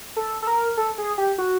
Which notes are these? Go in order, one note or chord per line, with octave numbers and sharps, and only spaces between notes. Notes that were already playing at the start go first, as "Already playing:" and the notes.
A4
A4
A#4
A4
G#4
G4
F#4